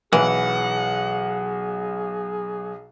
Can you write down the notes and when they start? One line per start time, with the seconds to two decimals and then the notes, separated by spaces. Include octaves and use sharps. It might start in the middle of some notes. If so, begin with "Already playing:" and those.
0.13 B1 E3 G#4 F#5